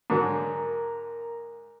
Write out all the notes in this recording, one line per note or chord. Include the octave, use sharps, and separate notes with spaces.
G#2 D3 F#3 A#4 A#5